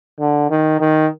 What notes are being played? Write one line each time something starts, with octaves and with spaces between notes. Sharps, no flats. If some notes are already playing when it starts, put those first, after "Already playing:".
D3
D#3
D#3